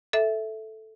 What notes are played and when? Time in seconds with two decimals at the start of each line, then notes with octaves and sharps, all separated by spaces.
0.13 A4 E5